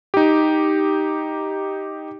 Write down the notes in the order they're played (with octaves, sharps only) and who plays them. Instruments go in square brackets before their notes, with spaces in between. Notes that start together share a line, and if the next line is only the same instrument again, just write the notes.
[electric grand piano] D#4 G4